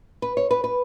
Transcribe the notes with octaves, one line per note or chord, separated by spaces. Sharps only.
B4
C#5
B4
B4